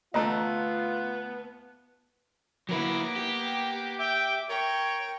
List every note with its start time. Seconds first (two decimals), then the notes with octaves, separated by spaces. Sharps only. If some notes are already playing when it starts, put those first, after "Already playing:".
0.14 D2 A3 B3 F4 D#5 A#5
2.69 F#3 A#3 B3 E4 D6
3.16 G4
3.99 E5 G5 D6
4.49 A#4 C#5 G5